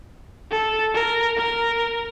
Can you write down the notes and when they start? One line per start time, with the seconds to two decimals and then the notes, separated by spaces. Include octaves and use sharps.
0.51 A4
0.94 A#4
1.36 A#4